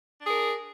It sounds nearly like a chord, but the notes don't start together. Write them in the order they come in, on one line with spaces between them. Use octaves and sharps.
D4 G#4 A#4